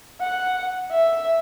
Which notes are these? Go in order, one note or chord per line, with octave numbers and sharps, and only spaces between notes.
F#5
E5